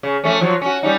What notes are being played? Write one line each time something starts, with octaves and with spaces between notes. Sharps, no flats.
C#3
F2 A3 C#4
F3 F#3 F4
C#4 F#4
G3 C#4 D#4